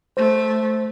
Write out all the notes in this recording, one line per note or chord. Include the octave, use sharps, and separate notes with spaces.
A3 C5